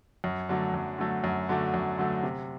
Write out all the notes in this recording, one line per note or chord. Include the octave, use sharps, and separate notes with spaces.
F#2
D3 F#3 A3
F#2
D3 F#3 A3
F#2
D3 F#3 A3
F#2
D3 F#3 A3
C3